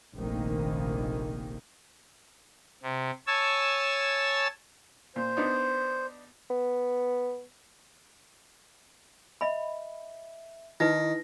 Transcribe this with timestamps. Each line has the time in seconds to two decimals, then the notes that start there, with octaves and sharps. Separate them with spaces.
0.16 F1 A#1 C3 D#3 A#3
2.83 C3
3.27 C#5 G#5 A5 E6
5.16 A#2 C5
5.37 B3 D4 D#4
6.50 B3
9.41 D#5 E5 B5
10.80 D#3 D#4 E4 B4 A#6